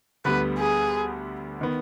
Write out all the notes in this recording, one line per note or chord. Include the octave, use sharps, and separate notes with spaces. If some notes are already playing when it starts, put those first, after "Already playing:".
D2 D3 G3 B3 B4
G#4
D#3 B3